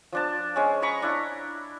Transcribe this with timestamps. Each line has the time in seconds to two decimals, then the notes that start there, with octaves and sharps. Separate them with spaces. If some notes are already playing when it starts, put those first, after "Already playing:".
0.12 F3 D4 A5
0.56 G#3 C#4
0.82 D#5 A#5 B5 C#6
1.02 D4 E4